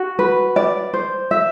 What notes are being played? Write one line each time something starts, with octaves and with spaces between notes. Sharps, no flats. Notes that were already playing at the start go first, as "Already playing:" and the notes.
Already playing: F#4
B4
D5
C5
E5